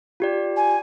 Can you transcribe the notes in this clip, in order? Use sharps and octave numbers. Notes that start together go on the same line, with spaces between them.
F4 G4 D5
G#5